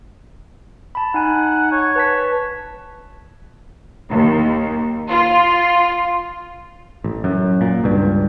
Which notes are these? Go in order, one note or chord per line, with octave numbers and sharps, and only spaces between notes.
A5 B5
D#4 F#5 G#5
C#5
B4 A5 B6
D#2
F4
A1
F#2
A#2
C#2 G2